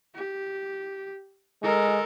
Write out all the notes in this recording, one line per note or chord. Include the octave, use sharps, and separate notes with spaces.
G4
G#3 A4 A#4